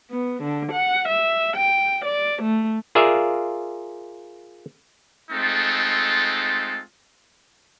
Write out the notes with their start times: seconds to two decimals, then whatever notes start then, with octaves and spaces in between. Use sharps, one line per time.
0.11 B3
0.43 D3
0.72 F#5
1.09 E5
1.57 G5
2.05 D5
2.42 A3
2.95 F4 G#4 A#4 D5 E5 F5
5.32 G#3 A3 C4 D#4 F4 A4